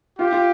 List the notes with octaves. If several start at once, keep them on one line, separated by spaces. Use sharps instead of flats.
F4 G4
F4